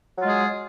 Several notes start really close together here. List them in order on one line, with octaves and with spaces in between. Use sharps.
F#3 F4 G#3 G#4